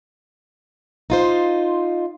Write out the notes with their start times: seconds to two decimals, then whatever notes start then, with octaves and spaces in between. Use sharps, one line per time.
1.10 D#4 F4 C5